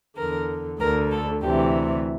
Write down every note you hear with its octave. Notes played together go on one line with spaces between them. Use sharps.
E2 D3 A#4
D2 D3 A#4
A4
D2 C3 E3 G4